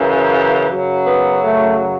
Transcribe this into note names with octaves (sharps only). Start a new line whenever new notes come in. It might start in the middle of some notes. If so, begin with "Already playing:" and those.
Already playing: F#2 C#3 E3
F#2 C#3 F#3
B3
A3